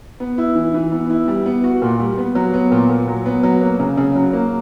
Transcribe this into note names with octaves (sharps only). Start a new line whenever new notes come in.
B3
E4
E3
E3
B3
E4
G3
B3
F#4
A#2
G3
B3
F#3
B3
A#2
A#2
F#3
B3
F#3
A#3
C#3
C#3
F#3
A#3